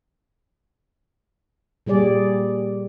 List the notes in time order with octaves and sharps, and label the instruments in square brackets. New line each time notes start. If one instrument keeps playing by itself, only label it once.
[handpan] A#2 G3 G#4 D5